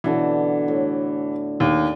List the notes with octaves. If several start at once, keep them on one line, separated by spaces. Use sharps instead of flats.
B2 D3 E3 D4
A2
D#2